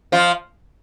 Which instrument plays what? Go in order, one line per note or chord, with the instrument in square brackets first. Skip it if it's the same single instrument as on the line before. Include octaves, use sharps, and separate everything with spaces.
[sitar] F3 F4